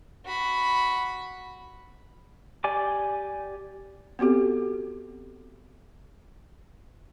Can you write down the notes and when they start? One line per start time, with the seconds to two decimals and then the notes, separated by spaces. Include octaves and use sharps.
0.26 F#4 B5
2.64 G4 D5 G#5 D6
4.19 B3 C4 F#4 G4 A4